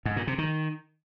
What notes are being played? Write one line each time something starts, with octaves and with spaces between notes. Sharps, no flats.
G#2
A#2
C3
D#3